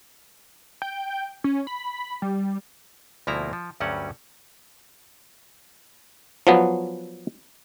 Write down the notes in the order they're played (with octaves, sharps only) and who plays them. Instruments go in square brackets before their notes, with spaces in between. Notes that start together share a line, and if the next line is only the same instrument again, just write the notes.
[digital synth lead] G5
C#4
B5
G3
[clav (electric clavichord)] D2 B2 F3 A#3 E4 A#5
F3
D2 G2 F#3 G3 C#4 F#5
F3 F#3 B3